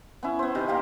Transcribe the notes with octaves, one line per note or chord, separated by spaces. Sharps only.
B3 C#4 E4
B3 C5
C3 D#3
A#3 G4 F5